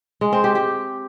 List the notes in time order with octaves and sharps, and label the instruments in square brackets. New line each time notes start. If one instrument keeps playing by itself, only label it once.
[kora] G#3
C4
G4
G4